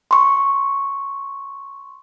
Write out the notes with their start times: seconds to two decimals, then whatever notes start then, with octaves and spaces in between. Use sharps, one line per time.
0.11 C6 C#6